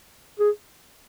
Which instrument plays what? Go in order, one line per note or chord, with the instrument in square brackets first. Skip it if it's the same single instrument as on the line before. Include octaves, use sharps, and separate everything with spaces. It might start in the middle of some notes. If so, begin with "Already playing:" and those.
[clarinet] G#4